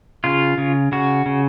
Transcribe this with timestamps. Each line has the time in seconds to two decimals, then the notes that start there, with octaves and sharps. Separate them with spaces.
0.24 C#3 F4
0.58 C#3
0.92 C#3 F#4
1.26 C#3